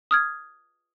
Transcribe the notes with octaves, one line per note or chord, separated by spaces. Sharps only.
D#6 F6 G#6